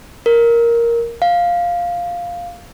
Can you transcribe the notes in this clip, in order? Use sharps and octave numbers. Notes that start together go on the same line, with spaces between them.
A#4
F5